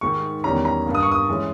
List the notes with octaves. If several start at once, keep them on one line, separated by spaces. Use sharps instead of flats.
G#2 D#3 G#3 C#6
E2 D#3 G3 C#4 A#5
A#5
G2 G3 A#3
D#6
C#6
D#6
E3 G#3 C#4